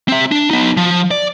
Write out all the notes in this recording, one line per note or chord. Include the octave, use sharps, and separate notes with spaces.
C4 E5
D4
B3 D#4
F3
D5